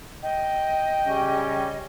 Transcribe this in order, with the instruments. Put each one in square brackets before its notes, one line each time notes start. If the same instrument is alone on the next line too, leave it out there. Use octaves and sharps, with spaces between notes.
[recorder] D#5 [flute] G5
[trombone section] C#3 G3 C#4